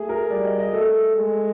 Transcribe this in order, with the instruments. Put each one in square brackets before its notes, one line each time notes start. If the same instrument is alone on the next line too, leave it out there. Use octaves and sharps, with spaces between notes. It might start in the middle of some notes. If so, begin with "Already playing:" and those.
Already playing: [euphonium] A3 [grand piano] G#4
[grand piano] A#4
[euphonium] G3 [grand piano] D5
[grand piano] D#5
D#5
[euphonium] A3 [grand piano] A4
[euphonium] G#3